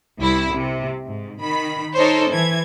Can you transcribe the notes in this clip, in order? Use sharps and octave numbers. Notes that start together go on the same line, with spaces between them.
C2 E4
C3
G#2
D#3 B5
D#4 A4 A#4 C5 C#5
E3 G#6